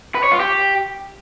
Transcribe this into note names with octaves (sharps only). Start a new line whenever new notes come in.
B4
C#5
F4
G4